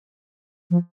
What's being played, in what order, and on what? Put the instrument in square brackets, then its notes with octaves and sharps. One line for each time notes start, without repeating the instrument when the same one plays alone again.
[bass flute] F3